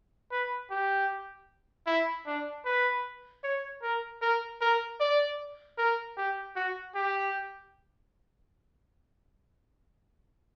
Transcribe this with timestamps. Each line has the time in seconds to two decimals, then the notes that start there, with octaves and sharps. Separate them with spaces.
0.32 B4
0.70 G4
1.87 E4
2.26 D4
2.65 B4
3.43 C#5
3.82 A#4
4.22 A#4
4.61 A#4
5.00 D5
5.78 A#4
6.17 G4
6.56 F#4
6.95 G4